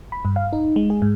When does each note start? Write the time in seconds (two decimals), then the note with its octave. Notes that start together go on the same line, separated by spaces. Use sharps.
0.12 B5
0.25 G2
0.36 F5
0.53 D#4
0.76 G#3
0.90 G#4
1.02 G#2